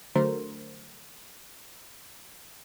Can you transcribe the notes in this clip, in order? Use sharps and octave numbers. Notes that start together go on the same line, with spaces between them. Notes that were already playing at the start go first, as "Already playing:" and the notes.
D3 F#3 A3 A#4 C5